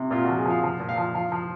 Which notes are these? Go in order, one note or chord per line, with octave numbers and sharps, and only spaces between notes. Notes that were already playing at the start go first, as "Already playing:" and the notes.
Already playing: C3
A#2 F4
F3 F#4
G#4
F3
F5
F3
A#2
F5
F3
F3 F5
F3